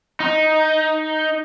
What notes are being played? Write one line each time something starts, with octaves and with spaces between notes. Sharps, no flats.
D#4